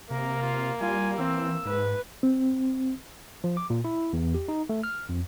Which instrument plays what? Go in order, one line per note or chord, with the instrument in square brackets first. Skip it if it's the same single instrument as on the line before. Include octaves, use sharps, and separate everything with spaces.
[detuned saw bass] C3 [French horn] A#3 [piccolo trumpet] A#4
[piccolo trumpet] F4
[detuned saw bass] G3 [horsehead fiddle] F4 [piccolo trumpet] G#5
[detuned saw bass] E3 [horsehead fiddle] C4 [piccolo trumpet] E6
[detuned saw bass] G#2 [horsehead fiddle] B4
[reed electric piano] C4
[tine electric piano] F3
D6
A#2
E4
E2
G4
D#4
A3
F6
F2